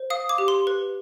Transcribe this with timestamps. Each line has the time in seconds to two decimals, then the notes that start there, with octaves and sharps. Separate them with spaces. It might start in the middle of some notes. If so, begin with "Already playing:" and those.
Already playing: C5
0.10 F5 D#6
0.29 D6
0.38 G4
0.48 C6
0.67 B4